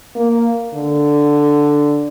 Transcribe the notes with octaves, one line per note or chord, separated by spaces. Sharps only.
A#3
D3